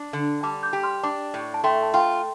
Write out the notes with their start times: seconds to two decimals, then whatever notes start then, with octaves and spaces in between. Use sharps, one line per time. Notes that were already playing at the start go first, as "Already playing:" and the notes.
Already playing: D4 A5 D6
0.13 D3
0.43 G3 A5 D6
0.63 D6 G6
0.73 G4
0.83 C6 F6
1.03 D4 A5 D6
1.34 A2
1.54 A5
1.64 A3 G5 C6
1.83 A5
1.94 F4 G5 C6